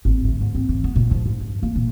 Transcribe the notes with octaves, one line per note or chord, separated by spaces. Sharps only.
G#1
D2
G#2
C4
E3
B3
A#2
F3
G#2
G2
A#3
A#2